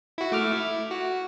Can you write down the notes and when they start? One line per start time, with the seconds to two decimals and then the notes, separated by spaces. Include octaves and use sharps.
0.18 E4 F#4
0.32 A3 D6 F6
0.52 E4
0.91 F#4